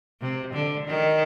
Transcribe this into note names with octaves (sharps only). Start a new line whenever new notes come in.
C3
D3
D#3